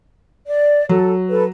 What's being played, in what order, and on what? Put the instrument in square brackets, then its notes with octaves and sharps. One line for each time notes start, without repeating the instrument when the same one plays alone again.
[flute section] D5
[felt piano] F#3 [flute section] A4
[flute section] A4 B4